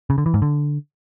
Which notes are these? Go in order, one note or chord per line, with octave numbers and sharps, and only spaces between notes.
C#3
D3
E3
G#2
D3